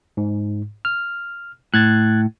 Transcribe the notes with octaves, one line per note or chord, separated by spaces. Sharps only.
G#2
F6
A2 F#6 G#6 A6